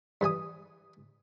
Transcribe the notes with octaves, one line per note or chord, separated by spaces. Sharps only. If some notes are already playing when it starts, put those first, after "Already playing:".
G2 E3 G#5 D#6